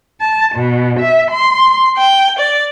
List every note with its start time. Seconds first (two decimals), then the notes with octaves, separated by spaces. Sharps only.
0.21 A5
0.55 B2
1.00 E5
1.31 C6
1.95 G5
2.38 D5